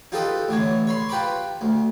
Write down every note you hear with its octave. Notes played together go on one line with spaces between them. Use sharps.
D#4 F4 G4 A4 B4 D#5
A1 D3 E3 C#5
C#5 B5 C6
F4 G4 B4 A#5 B5 D6
D2